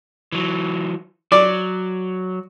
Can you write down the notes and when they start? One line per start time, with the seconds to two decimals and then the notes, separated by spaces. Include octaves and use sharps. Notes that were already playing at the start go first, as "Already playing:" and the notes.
0.32 E3 F#3
1.32 F#3 D5